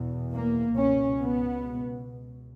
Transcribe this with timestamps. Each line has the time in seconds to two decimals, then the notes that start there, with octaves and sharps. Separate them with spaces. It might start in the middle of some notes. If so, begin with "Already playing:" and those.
Already playing: E2 B2
0.34 A#3
0.76 C#2 B2 C#4
1.19 B3